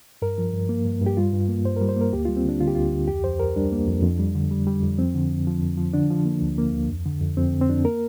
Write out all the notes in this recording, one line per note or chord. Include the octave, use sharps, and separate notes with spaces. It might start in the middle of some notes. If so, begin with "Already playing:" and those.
G2 A#4
F3
G2
A#3
G2
G2
G4
G3 F4
G2
A#3
G2 C5
A#4
G3
C5
A#3 A#4
D2 G4
G3 F4
C4
D3 D4
D3 F4
G4
D2 F4
D2
F2 G4
F2 C5
F2 A#4
G3 D4
A#3
F2
F2
G3
D3
G3
G3
F2
F3 C4
D3
F2
F3
F2
F3
D3 D4
F3
A#3
D2
A#3
D2
F2
D3
F2
F2 C4
D3
C4
F2 D4
A#3 A#4